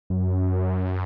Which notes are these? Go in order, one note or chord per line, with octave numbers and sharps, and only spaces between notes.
F#2